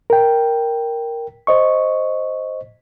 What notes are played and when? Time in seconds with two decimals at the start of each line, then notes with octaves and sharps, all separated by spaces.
0.10 A#4 G5
1.47 C5 D#5 C#6